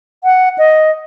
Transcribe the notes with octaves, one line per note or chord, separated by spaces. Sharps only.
F#5
D#5